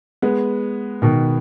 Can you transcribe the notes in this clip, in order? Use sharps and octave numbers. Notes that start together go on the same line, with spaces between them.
G#3 B3
B2 D#3